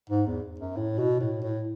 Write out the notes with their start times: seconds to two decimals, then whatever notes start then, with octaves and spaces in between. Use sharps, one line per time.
0.10 G#2
0.27 E2
0.60 F#2
0.77 A2
0.98 B2
1.20 A2
1.42 A2